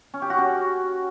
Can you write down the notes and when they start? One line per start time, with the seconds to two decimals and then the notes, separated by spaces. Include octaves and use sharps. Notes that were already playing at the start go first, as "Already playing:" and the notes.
0.14 C#4
0.22 G4
0.30 F#4
0.38 C#4